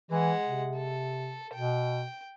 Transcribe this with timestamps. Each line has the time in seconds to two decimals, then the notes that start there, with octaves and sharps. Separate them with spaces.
0.11 E3 G#3 F#5
0.46 C3
0.76 A4
1.54 B2 G5